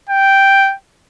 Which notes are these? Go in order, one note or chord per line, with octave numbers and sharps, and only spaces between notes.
G5